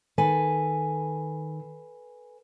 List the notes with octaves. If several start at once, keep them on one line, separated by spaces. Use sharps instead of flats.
D#3 A4 B4 G#5